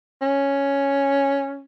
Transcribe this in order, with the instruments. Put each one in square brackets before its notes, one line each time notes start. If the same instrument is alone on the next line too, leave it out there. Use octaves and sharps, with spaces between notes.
[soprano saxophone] C#4